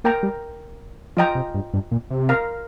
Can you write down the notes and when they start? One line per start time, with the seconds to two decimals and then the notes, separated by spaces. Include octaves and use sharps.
0.04 A#3 A#4 G5 A#5
0.23 G3
1.17 F3 F4 D#5 G5 A#5
1.35 C3
1.54 G2
1.74 G2
1.91 A#2
2.10 C3
2.29 A#4 F5 A#5